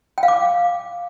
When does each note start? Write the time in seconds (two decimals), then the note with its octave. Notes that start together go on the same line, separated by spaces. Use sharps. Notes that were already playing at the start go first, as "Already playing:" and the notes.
0.18 G5
0.23 F5
0.28 D6